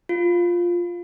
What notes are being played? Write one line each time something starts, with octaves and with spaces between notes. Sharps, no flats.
F4